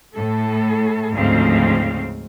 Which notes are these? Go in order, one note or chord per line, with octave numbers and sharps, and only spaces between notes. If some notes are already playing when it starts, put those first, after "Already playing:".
A2 A4
D2 G#2 C#3 F3 C4 F5